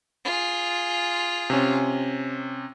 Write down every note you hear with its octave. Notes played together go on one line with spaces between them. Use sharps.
F4 G#4
C3 C#4